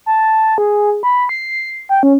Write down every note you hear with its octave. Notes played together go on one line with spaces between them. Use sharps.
A5
G#4
B5
C7
G5
C#4